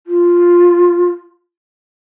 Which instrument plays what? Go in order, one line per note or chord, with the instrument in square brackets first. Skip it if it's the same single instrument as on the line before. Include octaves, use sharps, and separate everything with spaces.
[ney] F4